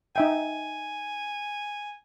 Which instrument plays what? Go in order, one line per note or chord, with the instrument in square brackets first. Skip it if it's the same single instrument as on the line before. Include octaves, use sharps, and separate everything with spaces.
[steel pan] D#4 E5 G5 [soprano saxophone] G#5